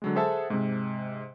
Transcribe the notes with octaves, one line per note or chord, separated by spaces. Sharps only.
D3 F#3 G#3
G#4 A4 C5 E5 F#5 A5
G#2 C3